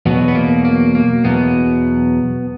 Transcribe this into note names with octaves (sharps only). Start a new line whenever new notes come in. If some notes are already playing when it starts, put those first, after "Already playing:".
E2 B2 F#3 B3
B3
A#3
A#3
A#3
E2 B2 F#3 B3